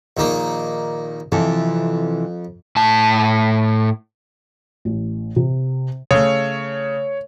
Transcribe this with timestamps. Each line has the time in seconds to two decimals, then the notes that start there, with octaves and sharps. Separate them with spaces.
0.17 A#1 D#3 A#3
1.32 F2 C3 E3 A4
2.77 A2 A5
4.85 A1
5.36 C3
6.11 C#3 A3 C#5